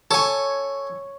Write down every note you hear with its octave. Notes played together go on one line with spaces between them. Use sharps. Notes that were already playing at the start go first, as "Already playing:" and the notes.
A4 C#5 G#5